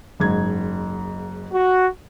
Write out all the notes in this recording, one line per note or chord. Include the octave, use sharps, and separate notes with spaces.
F#1 G#2 G#6
F#4